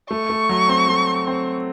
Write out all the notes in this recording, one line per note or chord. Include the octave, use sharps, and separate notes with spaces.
A3 C#6
A3
F#3
C4
A3
C4